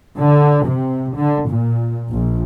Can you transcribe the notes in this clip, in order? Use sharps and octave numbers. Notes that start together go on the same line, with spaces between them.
D3
C3
D3
A#2
A#1